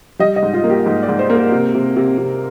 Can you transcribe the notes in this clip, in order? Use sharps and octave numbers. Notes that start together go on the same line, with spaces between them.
G3 D#5
D#5
G#2
F4
A#3
G4
G#2
D5
G#2
C5
A#3
A#4
C3
C3
C3
C3